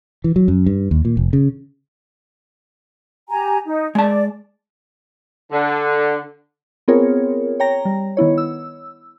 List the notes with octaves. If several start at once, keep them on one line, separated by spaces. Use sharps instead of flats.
E3
F#3
F#2
G2
D#2
A#2
F1
C#3
G4 G#5 A#5
D#4
G#3 D5 A5
D3
B3 C4 F4 G#4 A#4 C#5
C#5 G5 A#5 A#6
G3
D#3 B3 E4 C#5
E6